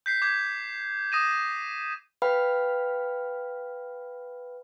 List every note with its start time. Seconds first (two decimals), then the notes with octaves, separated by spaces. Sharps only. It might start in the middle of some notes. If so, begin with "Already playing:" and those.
0.06 G6 B6 C7
0.22 D6 G6 G#6
1.12 D#6 A#6 D#7 E7
2.22 B4 F5 G5 B5 F6